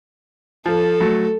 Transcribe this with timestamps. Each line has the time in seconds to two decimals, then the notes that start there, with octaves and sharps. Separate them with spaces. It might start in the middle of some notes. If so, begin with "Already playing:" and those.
0.66 F3 A4
1.00 F#3 A3